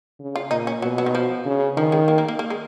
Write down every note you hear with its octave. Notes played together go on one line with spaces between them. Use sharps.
C#3
F4
A#2 D#4
C#4
B2 F#3
F#3
D#3
F3
C#3
D#3 F3
G#3
A#3
A#3
A#3
A#3
G#3